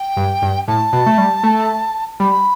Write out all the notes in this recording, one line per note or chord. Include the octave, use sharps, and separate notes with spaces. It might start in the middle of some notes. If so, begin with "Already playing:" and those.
Already playing: G5
G2
G2
A2 A5
B2
A3
G3
A3
G3 B5